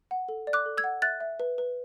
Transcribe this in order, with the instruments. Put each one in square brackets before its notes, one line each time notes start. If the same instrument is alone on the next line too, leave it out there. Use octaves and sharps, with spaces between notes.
[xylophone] F#5
A4
D5
D6 F#6
A4
E6 G#6
F#5
E5 F#6 A6
E5
B4
B4